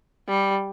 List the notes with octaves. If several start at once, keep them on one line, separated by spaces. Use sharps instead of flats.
G3